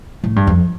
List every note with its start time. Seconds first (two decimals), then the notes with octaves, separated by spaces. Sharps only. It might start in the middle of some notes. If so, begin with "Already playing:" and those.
0.24 A2
0.36 G2
0.47 F2